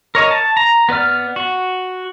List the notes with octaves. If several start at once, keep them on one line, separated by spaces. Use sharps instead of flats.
A#4 C#5 D#5
A5
A#5
B3 B4 D5 F6
F#4